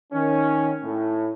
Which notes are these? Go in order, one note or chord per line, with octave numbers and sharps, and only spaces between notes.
D#3 C#4
A2